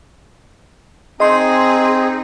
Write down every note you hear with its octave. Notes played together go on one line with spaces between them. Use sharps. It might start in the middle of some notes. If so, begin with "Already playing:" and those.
C4 D#4 G#4 D#5 C6